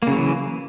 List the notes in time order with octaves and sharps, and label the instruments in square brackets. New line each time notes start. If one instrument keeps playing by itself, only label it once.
[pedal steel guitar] A#3
C#3
F#3
E3